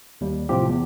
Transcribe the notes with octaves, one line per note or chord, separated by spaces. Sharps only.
D#2 G3
A2 C3 F3 F4 G4
E2